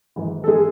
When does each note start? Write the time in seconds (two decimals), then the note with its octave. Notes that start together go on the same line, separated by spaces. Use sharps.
0.16 G#1 G#2 E3
0.44 A4
0.48 E3 G#3 G#4